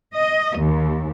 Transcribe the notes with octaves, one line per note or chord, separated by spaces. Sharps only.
D#5
D#2